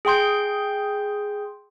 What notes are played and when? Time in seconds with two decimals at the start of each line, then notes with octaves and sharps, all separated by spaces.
0.05 G#4 G5 C6 G6